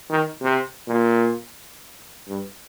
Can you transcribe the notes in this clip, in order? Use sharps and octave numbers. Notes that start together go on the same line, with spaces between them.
D#3
C3
A#2
G2